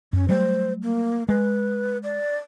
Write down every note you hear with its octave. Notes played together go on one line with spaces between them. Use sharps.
F#2 C#4
F#3 G3 A3 C5
A#3
G#3 B4
D5